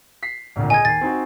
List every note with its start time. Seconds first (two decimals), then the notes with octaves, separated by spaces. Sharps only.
0.23 B6 C7
0.56 G#1 D2 A#2
0.70 G#4 D#5 G#5 G#6
0.85 D#2 A6 C7
1.01 C4 D#4 F#4